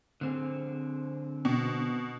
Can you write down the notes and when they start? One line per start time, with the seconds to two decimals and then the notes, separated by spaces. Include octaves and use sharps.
0.21 D3 C4 G#4
1.45 B2